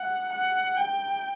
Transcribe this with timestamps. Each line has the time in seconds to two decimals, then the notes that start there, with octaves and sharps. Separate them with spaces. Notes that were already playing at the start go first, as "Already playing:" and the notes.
Already playing: F#5
0.30 F#5
0.77 G5